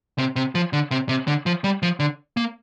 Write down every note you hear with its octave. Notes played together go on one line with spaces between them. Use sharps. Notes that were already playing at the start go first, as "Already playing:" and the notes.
C3
C3
F3
D3
C3
C3
D3
F3
G3
F3
D3
A#3